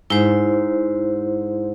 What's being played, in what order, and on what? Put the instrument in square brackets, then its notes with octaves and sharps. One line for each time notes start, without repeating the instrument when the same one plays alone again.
[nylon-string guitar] G#2 [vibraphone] E4 C5